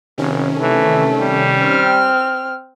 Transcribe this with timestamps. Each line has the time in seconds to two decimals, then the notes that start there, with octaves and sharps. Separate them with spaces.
0.18 F#1 C3 D#3 C#4
0.60 E3 A3
1.19 G3
1.62 C4 F6